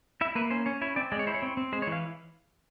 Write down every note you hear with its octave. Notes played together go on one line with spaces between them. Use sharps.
E4 E5
A#3 B4
C#4 C5
C#4 C#5
E4 C#5
C4 D5
G#3 D5
C#5
E4 C5
C#5
C4
C4
G#3 C5
C#5
E3
F5